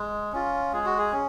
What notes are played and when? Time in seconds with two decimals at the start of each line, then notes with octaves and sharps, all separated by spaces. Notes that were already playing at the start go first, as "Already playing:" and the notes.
Already playing: G#3
0.33 C#4 F4
0.73 G#3 G#4
0.86 F#4
0.98 G#4
1.12 C#4